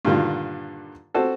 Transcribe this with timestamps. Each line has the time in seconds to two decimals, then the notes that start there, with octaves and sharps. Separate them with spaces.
0.05 G2 A#2 D3 D#3
1.14 C4 F#4 A4